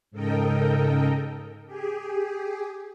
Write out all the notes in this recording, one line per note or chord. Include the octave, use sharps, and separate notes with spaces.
G#2 C#3 A4 A#4 D#5 G5
G4 G#4